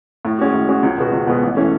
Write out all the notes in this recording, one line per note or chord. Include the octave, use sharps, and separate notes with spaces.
A2
G#3 C#4 F#4
A2
G#3 C#4 F#4
C#2
B2 G#3 B3 F#4
C#2
B2 G#3 B3 F#4
A1
E3 A3 C#4